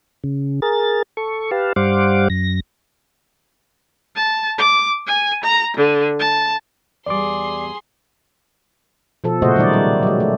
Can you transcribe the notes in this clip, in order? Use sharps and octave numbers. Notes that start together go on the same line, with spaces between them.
C#3
G#4 A#4 A6
A4 C#6
G4 B4 F5 A5
G2 G3 C5 F5 F#5 D6
F#2 A#6
A5
D6
G#5
A#5
D3
A5
E2 G3 G#4 D5 C6 D6
B2 F3 A4
A#2 C#3 A3 F#4 C5 D#5
D#3 F#3 G3 D#4 D5
G3
F#3 G#3
A3